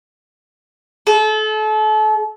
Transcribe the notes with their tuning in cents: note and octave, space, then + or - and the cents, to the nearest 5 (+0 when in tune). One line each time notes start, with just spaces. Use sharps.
A4 -35